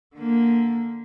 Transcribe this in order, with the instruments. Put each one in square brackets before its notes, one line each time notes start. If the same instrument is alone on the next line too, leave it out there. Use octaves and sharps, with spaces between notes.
[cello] D3 A#3